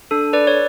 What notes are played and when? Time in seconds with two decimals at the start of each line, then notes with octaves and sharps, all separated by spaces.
0.11 D4 A4
0.33 B4 D5
0.47 C#5